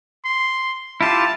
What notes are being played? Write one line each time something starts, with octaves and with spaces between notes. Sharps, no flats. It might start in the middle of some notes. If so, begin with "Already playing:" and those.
C6
E4 F4 G4 A5